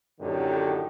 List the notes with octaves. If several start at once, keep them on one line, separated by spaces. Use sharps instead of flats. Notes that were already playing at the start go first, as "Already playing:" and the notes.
F#2 A2 D3 D#3 G4